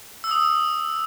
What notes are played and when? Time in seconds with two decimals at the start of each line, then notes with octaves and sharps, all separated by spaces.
0.24 E6
0.31 D#6